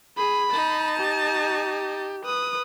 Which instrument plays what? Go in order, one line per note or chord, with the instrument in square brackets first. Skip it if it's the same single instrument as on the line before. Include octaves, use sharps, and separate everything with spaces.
[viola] G#4 [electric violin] B5
[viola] D#4 A5
[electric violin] G4
[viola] B4 [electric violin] D#6